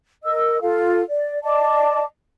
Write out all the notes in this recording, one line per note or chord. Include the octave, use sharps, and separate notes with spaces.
A#4 D#5 E6
F4 A4 F5
D5
D5 D#5 A5 D6